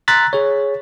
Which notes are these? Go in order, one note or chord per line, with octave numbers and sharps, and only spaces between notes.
A#5 C6 E6 F#6 A6 B6
G#4 C#5